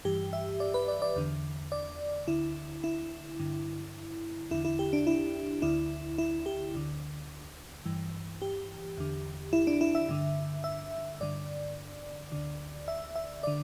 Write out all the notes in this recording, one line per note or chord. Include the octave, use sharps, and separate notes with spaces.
G2 E3 G4
E5
D5
B4
D5
D5
E2 D3
D5
D2 D3 E4
E4
G2 D3
E2 D3 E4
E4
G4
D4
E4
D2 D3 E4
E4
G4
D2 D3
G2 E3
G4
E2 D3
E4
D4
E4
E5
G2 D3
E5
G2 D3 D5
D2 D3
E5
E5
D3 D5